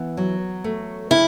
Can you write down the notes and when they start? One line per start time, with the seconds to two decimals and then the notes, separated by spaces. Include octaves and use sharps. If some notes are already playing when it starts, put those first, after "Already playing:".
Already playing: E3 B3
0.17 F#3
0.64 A3
1.11 C#3 E4